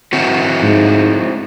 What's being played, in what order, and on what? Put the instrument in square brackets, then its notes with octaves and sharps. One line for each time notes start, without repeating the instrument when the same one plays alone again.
[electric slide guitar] C4 E4 F#4
[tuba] G#2